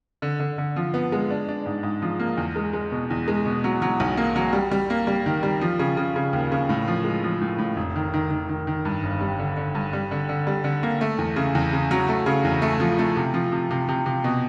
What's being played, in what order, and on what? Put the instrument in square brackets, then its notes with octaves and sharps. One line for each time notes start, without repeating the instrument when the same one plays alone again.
[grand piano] D3
D3
D3
F3
B3
G#3
D4
D4
G#2
G#2
F3
A#3
E2
G#3
G#3
B2
E2
G#3
B2
F#3
F#3
B1
A#3
F#3
G3
G3
A#3
G3
D#3
G3
F3
C#3
C#3
C#3
D#2
C#3
A2
F3
G#3
F3
A2
A2
F1
D#3
D#3
D#3
D#3
D#3
G2
G1
G3
D3
D3
G2
G3
D3
D3
G3
D3
A#3
A3
E2
C#3
E2
C#3
F#3
A3
C#3
E2
A3
F3
A3
C3
F3
C3
C3
C3
C3
B2